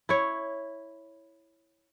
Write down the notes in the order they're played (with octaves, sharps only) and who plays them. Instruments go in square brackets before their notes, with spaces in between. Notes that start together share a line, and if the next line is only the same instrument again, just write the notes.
[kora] E4 C#5